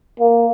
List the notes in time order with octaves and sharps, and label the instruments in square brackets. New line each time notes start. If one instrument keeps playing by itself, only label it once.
[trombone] A#3